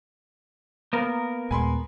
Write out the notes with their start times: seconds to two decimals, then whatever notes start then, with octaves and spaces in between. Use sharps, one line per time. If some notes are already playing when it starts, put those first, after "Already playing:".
0.93 A#3 B3 A#4
1.51 D#2 A#2 G#3 G#5 B5 C6